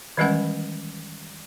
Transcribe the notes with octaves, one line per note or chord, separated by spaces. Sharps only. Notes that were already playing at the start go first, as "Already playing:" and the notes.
D#3 E3 G3 G#3 C#4 F#5